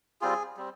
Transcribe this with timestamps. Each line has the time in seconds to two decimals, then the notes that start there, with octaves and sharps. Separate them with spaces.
0.21 G3 C4 F4 G#4
0.57 G3 C4